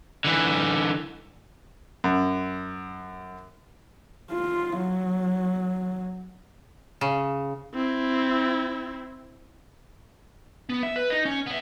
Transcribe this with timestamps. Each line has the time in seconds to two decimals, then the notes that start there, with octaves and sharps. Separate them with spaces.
0.25 D3 E3
2.04 F#2
4.32 F4
4.78 F#3
7.01 C#3
7.75 C4 E4
10.70 B3
10.83 E5
10.96 B4
11.10 D#4 D#5
11.25 C#4
11.46 B3 E5